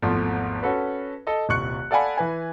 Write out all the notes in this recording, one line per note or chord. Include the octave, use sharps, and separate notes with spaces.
G#1 E2 F3 A3
C#4 F#4 A4 B4
A4 D#5
D#1 C2 C#6 F#6 C#7
A4 D5 F5 F#5 G#5 B5
E3 B4 G#5